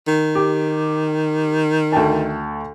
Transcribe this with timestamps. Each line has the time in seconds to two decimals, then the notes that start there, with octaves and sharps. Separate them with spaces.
0.08 D#3
0.35 G4
1.92 D2 G5 A5